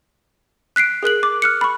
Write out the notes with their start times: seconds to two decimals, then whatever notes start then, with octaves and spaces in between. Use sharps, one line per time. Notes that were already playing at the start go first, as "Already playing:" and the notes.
0.76 F#6 B6 C7 D7
1.03 G#4 A#4 F#6 F#7
1.23 D6
1.42 F6 F#6 C#7
1.61 B5 C#6